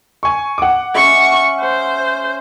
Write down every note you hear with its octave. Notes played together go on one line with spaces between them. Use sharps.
G#5 C#6
F#5 D6
C#4 E5 C#6
C5